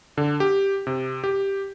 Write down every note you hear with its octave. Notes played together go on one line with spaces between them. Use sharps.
D3
G4
C3
G4